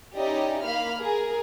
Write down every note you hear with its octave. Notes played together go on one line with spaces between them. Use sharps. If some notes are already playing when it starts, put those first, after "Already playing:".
C#4 D#4 E4 G4 D5 D#5
A#3 F5 B5 F6
G#4 A#4